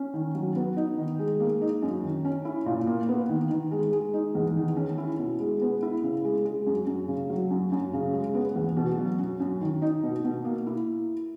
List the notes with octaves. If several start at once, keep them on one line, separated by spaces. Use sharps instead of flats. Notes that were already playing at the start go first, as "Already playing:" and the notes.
Already playing: C#4
D#3
F#3
B3
D#4
D#3
G#3
A#3
D#4
F#2
D#3
C#4
E4
A#2
A#3
B3
D#3
D#3
G#3
G#3
D#4
E2
D#3
C#4
E4
B2
G#3
B3
E4
C#3
G#3
G#3
F#2
F#2
C#3
F#3
F#2
F#2
C#3
G#3
B3
E2
B2
F#3
F#2
F#2
D#3
D#4
B2
B2
A#3
E4